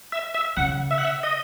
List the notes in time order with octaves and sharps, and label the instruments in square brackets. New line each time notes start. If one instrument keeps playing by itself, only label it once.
[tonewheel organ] E5
E5
[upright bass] C#3 [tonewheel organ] F#5
[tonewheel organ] E5
F#5
E5
D#5